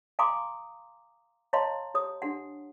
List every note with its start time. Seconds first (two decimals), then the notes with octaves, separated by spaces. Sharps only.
0.19 F5 G#5 A#5 C6 D6 D#6
1.53 C#5 D#5 F5 A5 A#5 C6
1.94 G4 C#5 D#6
2.22 D4 G4 F#5